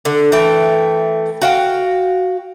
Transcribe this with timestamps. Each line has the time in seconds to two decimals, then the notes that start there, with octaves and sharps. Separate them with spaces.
0.05 D3
0.32 E3 A3 G5
1.42 F#4 F5 G5